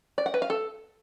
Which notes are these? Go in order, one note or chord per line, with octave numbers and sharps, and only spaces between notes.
D5
F#5
B4
F5
A4